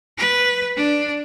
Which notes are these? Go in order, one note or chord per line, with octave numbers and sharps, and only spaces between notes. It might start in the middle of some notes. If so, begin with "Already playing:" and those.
B4
D4